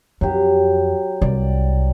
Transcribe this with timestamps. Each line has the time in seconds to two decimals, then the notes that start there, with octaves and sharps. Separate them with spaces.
0.21 F2 F#3 G4
1.22 C2 D5